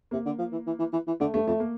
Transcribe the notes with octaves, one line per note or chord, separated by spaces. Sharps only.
C3 A#3
D3
F3
E3
E3
E3
E3
E3
D3 A3
G2 A3
F2 A3
A#3